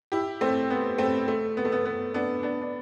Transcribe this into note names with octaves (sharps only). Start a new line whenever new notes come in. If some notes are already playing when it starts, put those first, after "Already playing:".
E4 G4
A3 C4
B3
A3 C4
A3
B3
A3
B3
B3
B3 D4
B3 D4
D4